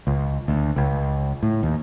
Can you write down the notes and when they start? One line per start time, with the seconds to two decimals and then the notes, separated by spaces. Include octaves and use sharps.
0.07 C#2
0.48 D2
0.76 C#2
1.43 A2
1.63 D#2